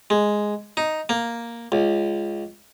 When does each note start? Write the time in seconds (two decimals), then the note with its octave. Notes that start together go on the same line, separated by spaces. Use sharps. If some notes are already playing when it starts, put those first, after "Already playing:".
0.10 G#3
0.77 D#4
1.09 A#3
1.72 C#2